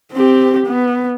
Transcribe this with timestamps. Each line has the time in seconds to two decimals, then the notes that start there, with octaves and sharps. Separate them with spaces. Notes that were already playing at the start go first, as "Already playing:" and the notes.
0.13 C4 G4
0.67 B3